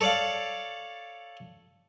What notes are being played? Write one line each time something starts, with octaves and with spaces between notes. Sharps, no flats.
A4 C#5 D5 F5 D6